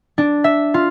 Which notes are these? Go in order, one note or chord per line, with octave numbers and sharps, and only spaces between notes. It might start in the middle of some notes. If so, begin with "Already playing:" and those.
D4
E5
F4